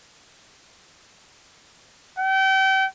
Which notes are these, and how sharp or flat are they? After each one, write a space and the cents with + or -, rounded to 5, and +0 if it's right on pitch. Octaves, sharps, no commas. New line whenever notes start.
G5 -35